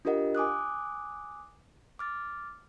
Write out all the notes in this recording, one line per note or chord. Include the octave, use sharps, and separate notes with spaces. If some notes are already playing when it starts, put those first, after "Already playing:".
D4 F4 G4 A#4 D#5 F#5
G#5 D6 D#6 F#6
D6 F6 A6